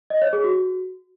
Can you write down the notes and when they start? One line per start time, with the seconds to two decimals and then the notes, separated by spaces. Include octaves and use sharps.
0.10 D#5
0.22 C#5
0.33 G#4
0.44 F#4